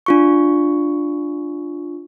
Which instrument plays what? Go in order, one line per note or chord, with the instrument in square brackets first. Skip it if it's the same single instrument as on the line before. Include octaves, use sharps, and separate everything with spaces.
[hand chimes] D4 F4 C#6